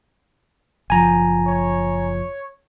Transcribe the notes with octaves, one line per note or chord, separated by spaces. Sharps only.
F#1 F3 G#5 A#5
C#5